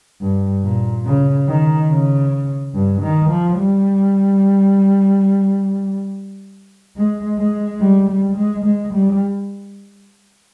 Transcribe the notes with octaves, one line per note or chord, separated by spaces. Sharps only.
G2
A#2
C#3
D#3
C#3
G2
D#3
F3
G3
G#3
G#3
G3
G3
G#3
G#3
G3